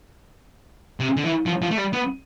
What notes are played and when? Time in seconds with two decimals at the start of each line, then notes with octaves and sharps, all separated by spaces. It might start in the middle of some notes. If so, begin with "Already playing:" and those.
1.00 C3
1.17 D3
1.24 E3
1.46 F3
1.62 F3
1.71 A3
1.78 G3
1.93 B3